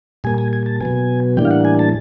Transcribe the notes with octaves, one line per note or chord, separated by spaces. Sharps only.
A#2 G3 A#3 G#5
G#5
G#5
A5
B2 F#3 B3 G#5
A2 E3 G3 A#3 D4 G5
F5
F#5
G#5
A5